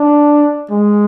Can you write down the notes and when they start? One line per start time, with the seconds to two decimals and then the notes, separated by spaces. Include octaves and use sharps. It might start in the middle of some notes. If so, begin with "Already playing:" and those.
Already playing: D4
0.70 G#3